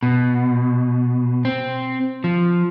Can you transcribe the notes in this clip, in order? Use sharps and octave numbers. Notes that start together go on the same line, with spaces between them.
B2
C4
F3